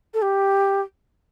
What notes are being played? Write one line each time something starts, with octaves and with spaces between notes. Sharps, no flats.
A4
G4